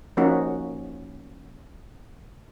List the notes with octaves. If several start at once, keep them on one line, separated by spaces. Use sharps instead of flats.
F3 A#3 C#4 D#4 F#4